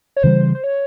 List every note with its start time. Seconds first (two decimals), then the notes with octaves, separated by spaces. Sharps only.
0.17 C#5
0.23 C#3 E3 G3 C5
0.55 C5
0.64 C#5